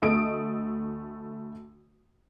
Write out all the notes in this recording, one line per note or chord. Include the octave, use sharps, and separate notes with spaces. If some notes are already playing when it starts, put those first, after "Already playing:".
D2 A3 D#5 D#6 D7